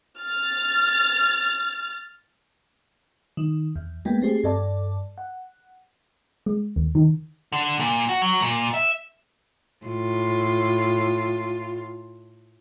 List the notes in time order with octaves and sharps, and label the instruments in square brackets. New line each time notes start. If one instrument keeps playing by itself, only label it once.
[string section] F6 A6
[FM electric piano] D#3
E2
G#3 A#3 B3 G5
A3 C4 G4 G#4
G2 A4 D5 A5
F#5
[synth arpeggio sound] G#3
D#2
D#3
[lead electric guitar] D3
A#2
F#4
F#3
A#2
E5
[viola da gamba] A2 F4